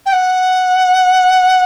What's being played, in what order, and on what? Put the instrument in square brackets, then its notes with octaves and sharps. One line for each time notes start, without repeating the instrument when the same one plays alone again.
[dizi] G5
F#5